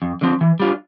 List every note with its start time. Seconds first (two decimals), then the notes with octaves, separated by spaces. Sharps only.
0.02 F2
0.21 D3 F3 C4
0.41 E3
0.60 G3 D4 F4